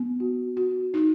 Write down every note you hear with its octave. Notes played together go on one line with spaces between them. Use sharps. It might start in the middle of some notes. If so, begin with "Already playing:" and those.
Already playing: B3
F#4
F#4
D#4